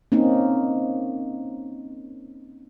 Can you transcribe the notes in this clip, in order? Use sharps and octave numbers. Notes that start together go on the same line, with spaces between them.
A#3 C4 C#4 D#4